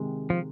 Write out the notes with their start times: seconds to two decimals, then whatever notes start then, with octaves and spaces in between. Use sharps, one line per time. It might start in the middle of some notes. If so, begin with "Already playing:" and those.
Already playing: C3 D#3 G#3
0.30 F3